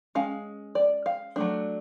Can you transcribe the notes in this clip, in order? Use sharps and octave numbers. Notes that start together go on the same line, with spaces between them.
G#3 C#4 F5
D5
F5
F#3 A3 D4